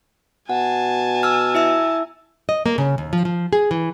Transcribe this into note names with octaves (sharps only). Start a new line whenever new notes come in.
B2 F#5 G#5 A5
E6 F6
E4 E5 E6
D#5
A#3
C#3
D#2
F3
F3
G#4
E3